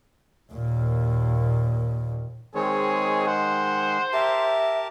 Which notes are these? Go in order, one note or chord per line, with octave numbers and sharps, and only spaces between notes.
D#2 A#2
D#3 G#3 C4 G#4 C#5
C5 F#5
G4 A#4 E5 A5